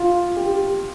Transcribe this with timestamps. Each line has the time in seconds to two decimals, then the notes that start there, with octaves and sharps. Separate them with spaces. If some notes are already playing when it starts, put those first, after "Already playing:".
Already playing: F4
0.36 G4